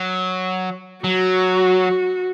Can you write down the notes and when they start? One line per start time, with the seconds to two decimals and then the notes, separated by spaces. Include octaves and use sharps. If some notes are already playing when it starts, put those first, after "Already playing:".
Already playing: F#3
1.04 F#3 F#4